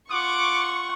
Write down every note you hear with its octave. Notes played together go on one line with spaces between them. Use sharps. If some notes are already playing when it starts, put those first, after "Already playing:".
F4 F#5 C#6 D6